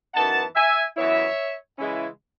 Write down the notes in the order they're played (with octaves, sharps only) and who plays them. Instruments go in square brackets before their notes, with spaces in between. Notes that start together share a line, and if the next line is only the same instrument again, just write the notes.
[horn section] F#2 E3 B3 D#4 F#5 A5
E5 G#5
F#2 E3 B3 E4 C#5 E5
C#3 E3 G#3 C#4 E4